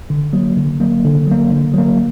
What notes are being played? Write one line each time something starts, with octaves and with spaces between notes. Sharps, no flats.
D3
F#3 A#3
D3
F#3 A#3
D3
F#3 A#3
D3
F#3 A#3